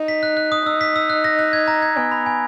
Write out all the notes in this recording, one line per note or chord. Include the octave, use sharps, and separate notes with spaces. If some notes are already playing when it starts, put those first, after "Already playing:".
Already playing: D#4
B6
F#6
F#6
D#6
D#4 E6
B6
E6
F#6
A#6
F#6
G#6
A#5
G#6
B3 G#5
B5
G#5